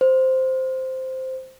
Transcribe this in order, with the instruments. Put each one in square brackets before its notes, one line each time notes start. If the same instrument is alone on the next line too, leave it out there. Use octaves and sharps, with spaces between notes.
[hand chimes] C5